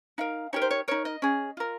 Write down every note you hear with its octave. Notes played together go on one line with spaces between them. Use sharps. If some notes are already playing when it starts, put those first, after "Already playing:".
D#4 A#4 F5
D#4 G4 A#4 C#5
C5
C#5
D#4 A#4 C#5
D#5
C#4 G#4
F4 A#4